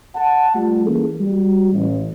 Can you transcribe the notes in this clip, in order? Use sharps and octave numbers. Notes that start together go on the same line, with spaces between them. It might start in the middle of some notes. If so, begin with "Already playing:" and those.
F#5 A5
G3 A3 F4
E3 A#3 C#4 G#4 A4
G3 F#4
A1